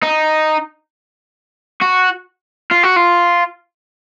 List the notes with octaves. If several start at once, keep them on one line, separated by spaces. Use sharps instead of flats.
D#4
F#4
F4
F#4
F4